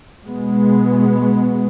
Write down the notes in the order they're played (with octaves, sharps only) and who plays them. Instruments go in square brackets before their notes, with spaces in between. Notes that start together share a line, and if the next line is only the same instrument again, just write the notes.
[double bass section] B2 G#3 B3